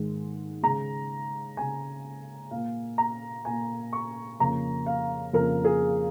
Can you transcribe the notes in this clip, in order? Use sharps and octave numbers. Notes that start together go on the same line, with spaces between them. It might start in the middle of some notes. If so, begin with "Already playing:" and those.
Already playing: G#2 D#3 G#3
C#3 G#3 A#5
C#3 G#3 G#5
A#2 F5
A#3
A#5
A#2 A#3 G#5
C#6
F2 C#3 A#3 A#5
F5
F2 C#3 A#3 A#4
G#4